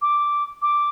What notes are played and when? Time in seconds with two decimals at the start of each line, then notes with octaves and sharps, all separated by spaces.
0.02 D6
0.62 D6